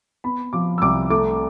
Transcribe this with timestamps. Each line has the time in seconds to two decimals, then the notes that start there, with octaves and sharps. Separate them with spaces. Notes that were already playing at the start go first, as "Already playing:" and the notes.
0.24 B3 B5
0.53 F3 D6
0.78 E6
0.82 C2 D6
1.10 A3 D6